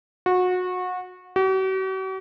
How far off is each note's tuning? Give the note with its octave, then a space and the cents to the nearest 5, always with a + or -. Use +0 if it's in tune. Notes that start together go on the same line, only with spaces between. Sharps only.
F#4 -25
F#4 +45